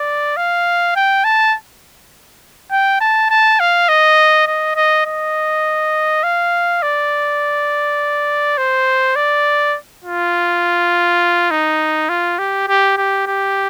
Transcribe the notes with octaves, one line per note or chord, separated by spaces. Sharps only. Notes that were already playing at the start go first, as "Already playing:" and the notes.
Already playing: D5
F5
G5
A5
G5
A5
A5
F5
D#5
D#5
D#5
D#5
F5
D5
C5
D5
F4
D#4
F4
G4
G4
G4
G4